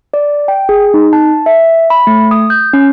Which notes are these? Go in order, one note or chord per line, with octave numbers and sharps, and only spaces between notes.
D5
G5
G#4
D#4
A5
E5
B5
A3
D#6
G6
C#4